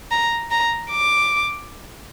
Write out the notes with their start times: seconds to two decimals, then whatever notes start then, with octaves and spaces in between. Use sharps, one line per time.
0.11 A#5
0.51 A#5
0.92 D6